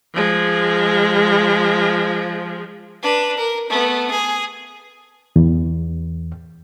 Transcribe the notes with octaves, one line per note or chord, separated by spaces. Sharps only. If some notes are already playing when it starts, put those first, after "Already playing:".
F3 G#3
D4 B4
A#4
A3 B3
G#4
E2